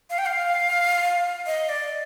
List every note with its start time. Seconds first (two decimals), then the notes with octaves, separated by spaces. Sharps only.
0.10 F5
0.18 G5
0.26 F5
1.46 D#5
1.69 D5